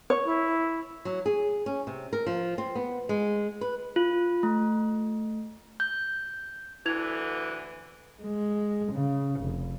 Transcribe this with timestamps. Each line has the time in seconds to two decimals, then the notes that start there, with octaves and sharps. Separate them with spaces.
0.10 C#5
0.25 E4
1.05 F#3
1.26 G#4
1.66 C#4
1.87 C3
2.13 A#4
2.27 F3
2.58 C4
2.75 B3
3.09 G#3
3.61 B4
3.96 F4
4.43 A3
5.80 G6
6.86 D2 D3 E3 E4 G#6 F7
8.23 G#3
8.92 C#3
9.40 F1